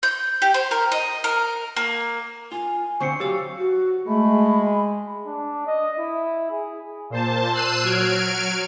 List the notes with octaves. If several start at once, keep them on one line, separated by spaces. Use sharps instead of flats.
G6
G4
C5
A#4
D#5
A#4
A#3
F4 G#5
D3 C4 C#6 C7 C#7
F#3 G4 F5 E6
F#4
G#3 A3 B5
D4
D#5
E4
G#4
A#2 C5 A5
E6 F#6 C7 D#7 E7
F#3 F6 G#6 D7